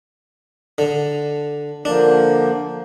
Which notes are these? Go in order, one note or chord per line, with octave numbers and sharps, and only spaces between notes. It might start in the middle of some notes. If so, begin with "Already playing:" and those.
D3
D3 F3 A#3 D4